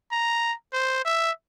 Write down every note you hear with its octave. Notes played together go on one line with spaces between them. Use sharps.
A#5
C5
E5